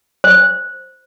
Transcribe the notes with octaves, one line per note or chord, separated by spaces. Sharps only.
C5